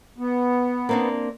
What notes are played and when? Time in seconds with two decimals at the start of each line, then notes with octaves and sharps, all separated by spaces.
0.18 B3
0.89 A#3 C4 D4